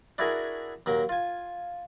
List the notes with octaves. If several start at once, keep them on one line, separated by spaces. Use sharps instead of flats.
D4 E4 F#4 G#4 A#4 G#5
D#2 F#3 A#4
F4 G#5